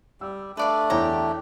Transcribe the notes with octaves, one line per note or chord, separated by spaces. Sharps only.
G3 E6
A3 D4 B4 D5 F5
E2 G4 C#5 G5 A#5